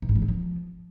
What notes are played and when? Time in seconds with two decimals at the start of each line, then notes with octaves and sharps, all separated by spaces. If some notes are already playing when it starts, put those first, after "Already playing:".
0.02 B2
0.09 G#2
0.15 E3
0.22 C4
0.28 F3